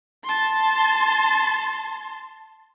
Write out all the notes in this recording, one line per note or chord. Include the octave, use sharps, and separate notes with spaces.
A5 C6